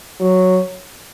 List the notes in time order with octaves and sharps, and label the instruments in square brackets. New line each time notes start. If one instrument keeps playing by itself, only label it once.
[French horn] F#3